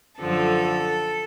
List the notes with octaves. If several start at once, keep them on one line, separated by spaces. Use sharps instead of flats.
F#2 D3 F3 A4